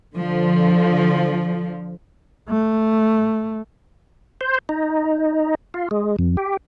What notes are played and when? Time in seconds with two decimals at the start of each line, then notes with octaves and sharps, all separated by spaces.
0.14 D3 F3
2.49 A3
4.41 C5
4.69 D#4
5.74 F4
5.91 G#3
6.19 F2
6.37 G4